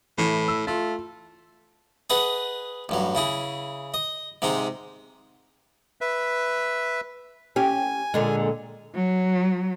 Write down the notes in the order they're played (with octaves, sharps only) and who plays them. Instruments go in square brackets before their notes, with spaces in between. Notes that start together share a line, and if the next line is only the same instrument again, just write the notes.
[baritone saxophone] A2 [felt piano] E3
[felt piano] E6
[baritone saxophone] A3 [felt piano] F4
[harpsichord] G#4 B4 D#5 F#5
A1 G2 F#3
C#3 E4 G#4
D#5
G#2 C3 G#3 D#4
[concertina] B4 E5
[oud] C#4 G4 [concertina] G#5
[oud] A#2 D3 G#3
[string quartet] F#3